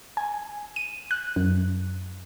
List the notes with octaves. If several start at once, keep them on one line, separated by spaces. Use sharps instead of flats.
G#5
D#7
F#6
F#2